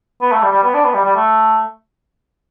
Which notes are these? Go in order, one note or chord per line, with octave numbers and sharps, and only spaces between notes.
B3
A3
G3
G3
B3
D4
B3
G3
G3
A3